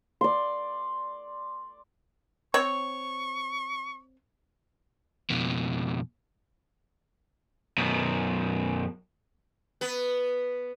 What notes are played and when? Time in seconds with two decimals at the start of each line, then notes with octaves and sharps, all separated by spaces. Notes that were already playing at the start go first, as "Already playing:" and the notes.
0.21 D5 C6
2.54 C4 C#5 C#6
5.30 F2 B2
7.78 F#2 B2
9.81 B3 B4